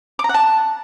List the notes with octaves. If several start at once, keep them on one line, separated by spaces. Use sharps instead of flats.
D6
A#5
F#5
A5